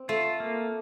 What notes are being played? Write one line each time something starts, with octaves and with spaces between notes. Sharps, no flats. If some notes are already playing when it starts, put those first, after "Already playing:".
Already playing: C4
A3 F4
A#3